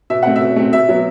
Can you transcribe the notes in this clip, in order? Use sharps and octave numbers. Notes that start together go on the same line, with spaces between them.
B2 E5
A3 C4 F#5
E5
B2
A3 C4
B2 E5
F#3 B3